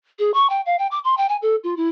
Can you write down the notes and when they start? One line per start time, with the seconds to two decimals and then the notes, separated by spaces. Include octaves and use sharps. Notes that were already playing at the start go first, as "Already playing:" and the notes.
0.19 G#4
0.34 C#6
0.50 G5
0.66 F5
0.79 G5
0.91 D6
1.04 C6
1.17 G5
1.29 G#5
1.42 A4
1.64 F4
1.77 E4